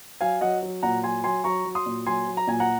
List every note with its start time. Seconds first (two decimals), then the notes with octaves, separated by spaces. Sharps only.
0.21 F#3 F5 G#5
0.41 F#3 D#5 F#5
0.62 F#3
0.83 A#2 F#5 A#5
1.03 F#3 G#5 C6
1.24 F#3 G#5 C6
1.44 F#3 A#5 C#6
1.65 F#3
1.75 C6 D#6
1.86 A#2
2.06 F#3 G#5 C6
2.27 F#3
2.37 A#5
2.47 A#2 G#5
2.60 F#5 A#5